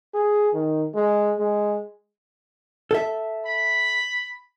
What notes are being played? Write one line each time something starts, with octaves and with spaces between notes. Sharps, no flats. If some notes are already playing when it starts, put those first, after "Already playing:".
G#4
D#3
G#3
G#3
A4 E5
B5